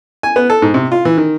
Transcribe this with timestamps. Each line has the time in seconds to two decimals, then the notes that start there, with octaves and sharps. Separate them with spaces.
0.23 G#5
0.36 B3
0.50 A4
0.62 G#2
0.74 C3
0.92 F4
1.05 E3
1.18 D#3